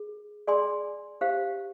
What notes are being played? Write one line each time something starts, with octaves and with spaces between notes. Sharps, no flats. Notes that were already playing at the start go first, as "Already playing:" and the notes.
Already playing: G#4
G#4 D5 G#5 C6
G4 C5 F5